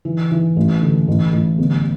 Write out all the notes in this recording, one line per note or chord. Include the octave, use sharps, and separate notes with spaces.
E3
E3
A1
D3
A1
A1
G1